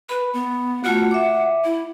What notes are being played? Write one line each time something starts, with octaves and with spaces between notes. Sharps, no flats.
B4 B5
B3
A3 F4 F#4 F#5
E5 D6
E4